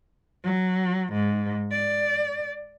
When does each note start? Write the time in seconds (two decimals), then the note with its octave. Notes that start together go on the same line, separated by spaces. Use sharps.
0.44 F#3
1.13 G#2
1.72 D5